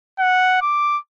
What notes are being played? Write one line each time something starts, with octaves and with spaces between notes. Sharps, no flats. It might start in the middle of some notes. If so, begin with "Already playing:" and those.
F#5
D6